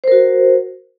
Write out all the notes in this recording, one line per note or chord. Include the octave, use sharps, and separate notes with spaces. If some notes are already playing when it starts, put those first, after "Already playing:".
F#4 A#4 C5